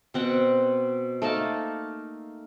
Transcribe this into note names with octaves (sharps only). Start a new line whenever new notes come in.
B2 C4 F#5
A3 A#3 D#4 A5